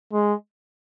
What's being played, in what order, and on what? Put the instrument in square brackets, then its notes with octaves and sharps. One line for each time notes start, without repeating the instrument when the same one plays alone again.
[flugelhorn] G#3